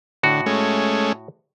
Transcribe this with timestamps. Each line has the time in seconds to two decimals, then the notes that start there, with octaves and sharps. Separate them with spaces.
0.23 A2 D3 F#4
0.46 G#3 A3 C#4